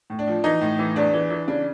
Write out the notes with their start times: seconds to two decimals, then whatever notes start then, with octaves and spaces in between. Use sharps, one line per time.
0.10 A2
0.19 D4
0.27 F3
0.44 E3 D#4
0.61 A2
0.79 E3
0.96 E2 D4
1.13 E3
1.30 E3
1.47 C#3 D4